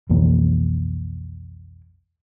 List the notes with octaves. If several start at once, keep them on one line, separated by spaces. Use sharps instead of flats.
B1 F2 E3 A#3